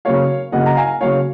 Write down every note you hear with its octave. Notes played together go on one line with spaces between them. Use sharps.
C#3 F#3 A#3 C#5 F5
C#3 F#3 A#3 D#5 F#5
A#5
F5 G#5
C#3 F#3 A#3 C#5 F5